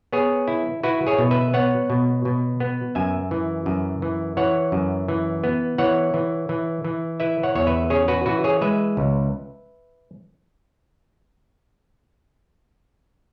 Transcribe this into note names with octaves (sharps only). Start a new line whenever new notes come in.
B3 G#4 C#5
E4
E4 F#4 B4
G#4 C#5
B2
B4 E5
B3 C#5 F#5
B2
B2
B3
F#2 E5 G#5
E3
F#2
E3
E3 C#5 F#5
F#2
E3
B3
E3 C#5 F#5
E3
E3
E3
E4 B4 E5
C#5 F#5
E2 C#5
B4 E5
C#4 G#4 C#5
F#4 B4
E3 F#4 B4
G#4 C#5
G#3 B4 E5
C#2